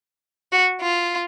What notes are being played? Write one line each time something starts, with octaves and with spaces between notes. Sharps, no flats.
F#4
F4